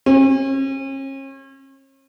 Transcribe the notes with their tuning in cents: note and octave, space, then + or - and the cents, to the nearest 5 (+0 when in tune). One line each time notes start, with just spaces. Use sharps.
C#4 -40